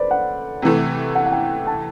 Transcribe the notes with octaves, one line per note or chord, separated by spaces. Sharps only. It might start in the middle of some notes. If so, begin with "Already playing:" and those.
Already playing: A4 B4 C5 D5
F#5
C3 E3 A3
F#5
F#5
G5
A5